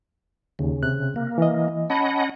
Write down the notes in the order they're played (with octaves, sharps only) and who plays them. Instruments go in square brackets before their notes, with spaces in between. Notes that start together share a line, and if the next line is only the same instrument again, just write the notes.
[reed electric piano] D#2 [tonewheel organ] C#3
[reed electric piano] C3 F#6
[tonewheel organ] A#3
[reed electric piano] E3 D#5
[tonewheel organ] C#4 D#5 F#5 [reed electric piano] A5 B5